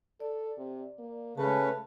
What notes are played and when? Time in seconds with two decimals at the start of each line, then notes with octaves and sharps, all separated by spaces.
0.20 A4 D5
0.57 C3
0.99 A#3
1.37 C#3 G#3 A3 C#4 B4 A5